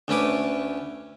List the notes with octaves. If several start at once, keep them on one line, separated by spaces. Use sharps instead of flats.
D2 A3 C#4 B4 D6